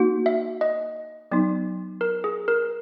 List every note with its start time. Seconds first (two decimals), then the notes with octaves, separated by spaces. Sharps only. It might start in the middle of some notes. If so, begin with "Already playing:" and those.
Already playing: A#3 D#4 F#4
0.26 E5
0.61 D#5
1.31 F#3 B3 D#4
2.01 A#4
2.24 G#4
2.48 A#4